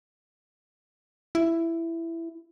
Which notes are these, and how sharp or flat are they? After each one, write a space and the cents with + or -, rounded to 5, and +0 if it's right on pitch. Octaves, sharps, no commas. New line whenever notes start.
E4 +10